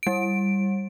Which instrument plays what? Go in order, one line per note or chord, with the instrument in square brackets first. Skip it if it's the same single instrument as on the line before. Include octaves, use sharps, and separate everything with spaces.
[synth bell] G3 D7